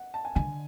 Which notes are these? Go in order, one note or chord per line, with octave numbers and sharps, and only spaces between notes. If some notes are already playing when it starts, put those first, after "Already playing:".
Already playing: F#5
A5
G#5
D3 G#5